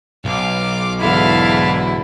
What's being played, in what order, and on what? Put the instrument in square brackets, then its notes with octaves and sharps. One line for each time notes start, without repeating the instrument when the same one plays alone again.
[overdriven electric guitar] B1 [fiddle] F5 D6
[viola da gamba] E2 G#2 D3 [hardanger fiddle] E4 [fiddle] A4 F5